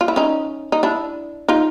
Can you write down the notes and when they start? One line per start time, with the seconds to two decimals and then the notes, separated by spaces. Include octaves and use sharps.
0.01 F4
0.08 E4
0.16 C#4 D#4
0.72 D#4
0.83 D4 E4
1.49 D#4 F4